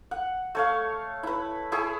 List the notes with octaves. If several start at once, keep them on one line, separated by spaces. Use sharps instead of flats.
F#5
A3 C#5 F5
E4 B4
E4 G#4 C#6